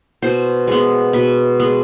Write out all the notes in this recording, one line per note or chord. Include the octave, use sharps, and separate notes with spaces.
B2 C5
G#3 B3
B2 B4
G#3 B3